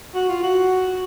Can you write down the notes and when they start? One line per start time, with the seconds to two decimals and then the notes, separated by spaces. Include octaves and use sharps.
0.14 F#4
0.29 F4
0.43 F#4